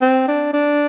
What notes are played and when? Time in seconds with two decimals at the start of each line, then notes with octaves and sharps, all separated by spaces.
0.02 C4
0.28 D4
0.53 D4